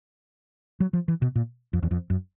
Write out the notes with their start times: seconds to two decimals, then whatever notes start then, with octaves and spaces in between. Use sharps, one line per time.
0.80 F#3
0.93 F3
1.08 E3
1.22 B2
1.35 A#2
1.73 F2
1.83 E2
1.91 F2
2.10 F#2